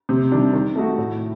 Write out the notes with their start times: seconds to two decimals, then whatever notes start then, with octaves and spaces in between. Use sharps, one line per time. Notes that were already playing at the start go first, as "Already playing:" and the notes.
0.09 C3
0.32 D#3 G3 D4
0.53 D#3
0.76 A3 D#4 F#4
0.98 A2